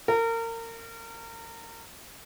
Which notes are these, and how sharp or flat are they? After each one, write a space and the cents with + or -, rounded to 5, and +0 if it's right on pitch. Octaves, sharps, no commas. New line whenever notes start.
A#4 -30